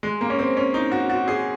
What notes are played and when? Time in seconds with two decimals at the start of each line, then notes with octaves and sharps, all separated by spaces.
0.03 G#3
0.21 A#3
0.30 C#4
0.39 C4
0.57 C#4
0.74 D#4
0.92 F#4
1.09 F#4
1.28 G#4